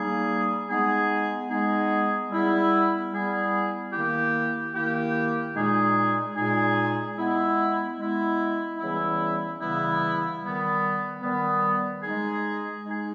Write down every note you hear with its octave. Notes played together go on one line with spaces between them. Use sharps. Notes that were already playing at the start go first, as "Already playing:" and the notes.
Already playing: G3 A#3 D#4 G#4
G#3 B3 D#4 G#4
G#3 B3 D#4 G#4
G3 B3 E4 G#4
G3 B3 E4 G#4
D#3 A#3 E4 G4
D#3 A#3 E4 G4
A#2 G#3 D#4 G#4
A#2 G#3 D#4 G#4
G#3 B3 E4
G#3 B3 E4
C#3 E3 G3 B3 E4
C#3 E3 G3 B3 E4
D#3 G3 B3
D#3 G3 B3
G#3 D#4 G#4
G#3 D#4 G#4